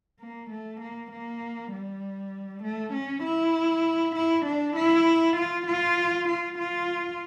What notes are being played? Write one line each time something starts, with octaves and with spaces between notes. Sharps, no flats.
A#3
A3
A#3
A#3
G3
A3
C#4
E4
E4
D4
E4
F4
F4
F4
F4